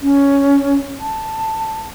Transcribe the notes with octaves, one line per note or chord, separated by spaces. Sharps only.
C#4
A5